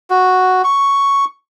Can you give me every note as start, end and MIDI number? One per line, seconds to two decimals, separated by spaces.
0.10 0.62 66
0.64 1.25 85